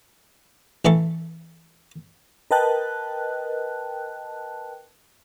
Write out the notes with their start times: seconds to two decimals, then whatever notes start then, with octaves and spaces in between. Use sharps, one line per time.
0.85 A1 E3 A3 A4 C#6
2.51 A#4 B4 D#5 G5 A5 F#6